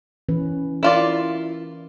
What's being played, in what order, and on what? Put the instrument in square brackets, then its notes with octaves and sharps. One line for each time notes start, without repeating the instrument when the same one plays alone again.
[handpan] E3 C#4 B4
[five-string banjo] E4 F4 D5 [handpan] A#4